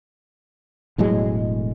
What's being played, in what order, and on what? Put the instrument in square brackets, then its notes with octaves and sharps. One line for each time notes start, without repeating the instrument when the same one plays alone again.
[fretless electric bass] E1 A2 F#3 G#3